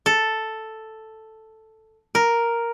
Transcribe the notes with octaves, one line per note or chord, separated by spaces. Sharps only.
A4
A#4